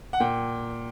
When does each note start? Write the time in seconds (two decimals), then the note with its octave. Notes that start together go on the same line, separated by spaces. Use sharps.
0.13 F#5
0.20 A#2 G5